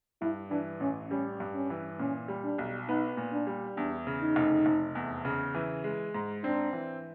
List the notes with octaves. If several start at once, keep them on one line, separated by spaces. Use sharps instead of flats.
G2 E4
E3 D4
A1 C#4
G3 C#4
G2
C#4
E3
A#2 C#4
G3
D4
B1
B3 D#4
A#2
D4
G3
E2 D4
C#3
D#4
F1
F1
E2
C#3
E3
G#3
G#2
C4 D4
E3